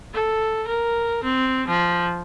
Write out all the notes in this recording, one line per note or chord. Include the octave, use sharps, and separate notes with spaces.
A4
A#4
C4
F3